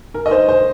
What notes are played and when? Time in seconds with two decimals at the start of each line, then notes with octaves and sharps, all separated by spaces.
0.14 A#4
0.26 D#5
0.31 C5
0.48 C5